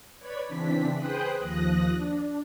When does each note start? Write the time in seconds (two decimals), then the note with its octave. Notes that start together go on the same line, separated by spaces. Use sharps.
0.19 B4 C#5 D5 B5 G#6 B6
0.47 C#3 E3 C4 D4 B6
0.96 G#4 B4 C5 G5 D#6 F#6
1.39 D#2 F3 D#6 F#6 A#6
1.94 D4